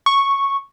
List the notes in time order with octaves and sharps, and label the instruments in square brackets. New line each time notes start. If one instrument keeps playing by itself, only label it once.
[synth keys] C#6